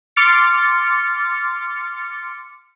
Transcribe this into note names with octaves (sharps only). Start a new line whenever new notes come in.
C6 D6 F6 A6 C#7